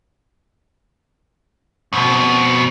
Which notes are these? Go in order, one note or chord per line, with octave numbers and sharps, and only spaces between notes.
F2 B2